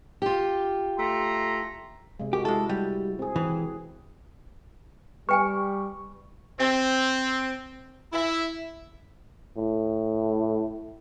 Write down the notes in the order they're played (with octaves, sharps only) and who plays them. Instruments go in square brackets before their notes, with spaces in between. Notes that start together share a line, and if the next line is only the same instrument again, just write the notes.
[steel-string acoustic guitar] F4 G4
[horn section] A3 A#5 C6
[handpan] C3 G#3
[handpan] F#4 A#4 [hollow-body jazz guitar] G4
[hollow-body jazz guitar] G#3 A4 [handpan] E4
[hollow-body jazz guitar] G3
[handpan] C4 G#4
[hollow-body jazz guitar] E3
[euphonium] G3 [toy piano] B4 G5 G#5 [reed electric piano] C#6
[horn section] C4
E4
[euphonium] A2